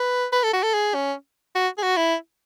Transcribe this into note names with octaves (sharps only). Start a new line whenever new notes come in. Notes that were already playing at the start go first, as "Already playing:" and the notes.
Already playing: B4
B4
A4
F#4
A4
G#4
C#4
F#4
G#4
F#4
E4